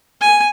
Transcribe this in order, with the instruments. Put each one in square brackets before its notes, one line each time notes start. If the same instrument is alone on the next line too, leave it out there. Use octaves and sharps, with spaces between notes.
[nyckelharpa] G#5